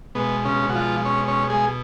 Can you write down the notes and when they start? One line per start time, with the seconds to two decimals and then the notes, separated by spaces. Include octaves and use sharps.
0.15 B2 G#3 B3
0.45 C#3 C#4
0.69 F#4
0.75 F3 F4
1.05 C#4 C#5
1.28 C#4 C#5
1.50 G#3 G#4